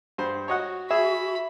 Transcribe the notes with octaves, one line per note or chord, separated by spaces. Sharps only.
G2 C5
F#4 C#5 D#5 F#5
G#4 E5 B5